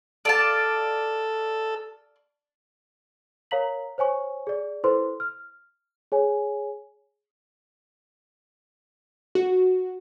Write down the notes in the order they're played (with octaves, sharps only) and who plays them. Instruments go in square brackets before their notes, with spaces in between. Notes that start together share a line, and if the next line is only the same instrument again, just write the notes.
[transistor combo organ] A4 [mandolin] D5 F5 A5
[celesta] A#4 C#5 F5 A#5 B6 F#7
C5 C#5 G#5 C#6
G#4 D5
E4 A4 B4 C5 C6
F6
G#4 C#5 G#5
[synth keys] F#4